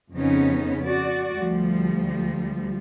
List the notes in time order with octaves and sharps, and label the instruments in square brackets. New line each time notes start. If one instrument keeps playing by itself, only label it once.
[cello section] F2 C#3 B3 C#4 D#4
F#4 D5
D2 F3 G3